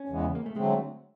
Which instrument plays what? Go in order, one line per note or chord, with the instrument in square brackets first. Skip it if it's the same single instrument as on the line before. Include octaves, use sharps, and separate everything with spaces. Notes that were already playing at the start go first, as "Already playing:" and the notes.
Already playing: [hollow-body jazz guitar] C#4
[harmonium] E2 C#3 E3 G#3 B3
[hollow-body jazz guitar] A#3
A3
[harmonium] D3 F#3 A3 C4 [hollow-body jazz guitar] G#3